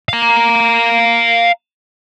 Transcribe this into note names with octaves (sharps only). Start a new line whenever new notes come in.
F5 A#5